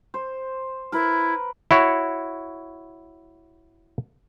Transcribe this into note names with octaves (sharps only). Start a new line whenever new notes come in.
C5
E4 A#4 B4
E4 F#4 C#5